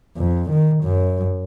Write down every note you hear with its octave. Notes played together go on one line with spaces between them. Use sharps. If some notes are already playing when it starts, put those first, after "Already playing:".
F2
D#3
F#2